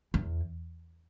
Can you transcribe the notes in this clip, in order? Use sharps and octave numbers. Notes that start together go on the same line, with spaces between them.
E2